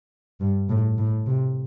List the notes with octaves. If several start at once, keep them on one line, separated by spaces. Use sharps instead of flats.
G2
A2
A2
C3